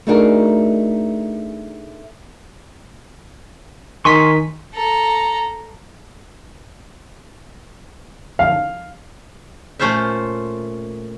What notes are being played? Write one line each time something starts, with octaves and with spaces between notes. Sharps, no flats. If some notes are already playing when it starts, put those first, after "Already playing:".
A3 D4 D#4 F#4 G#4 A#4
D#3 D#4 G#5 C6 C#6 B6
A4 A#5
F5
A#2 A3 C#4 F4 C5 E5